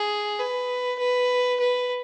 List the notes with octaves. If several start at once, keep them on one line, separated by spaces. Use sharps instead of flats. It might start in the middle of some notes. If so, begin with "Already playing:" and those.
Already playing: G#4
B4
B4
B4